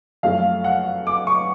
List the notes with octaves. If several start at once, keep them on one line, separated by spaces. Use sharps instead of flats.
F#2 F3 A3 F5
F#5
D6
C#6